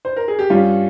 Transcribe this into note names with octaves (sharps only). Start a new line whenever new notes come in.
C5
A#4
G#4
G4
G2 G3 C#4 F4